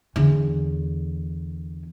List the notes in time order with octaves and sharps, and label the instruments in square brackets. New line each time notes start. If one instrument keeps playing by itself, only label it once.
[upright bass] E2 D3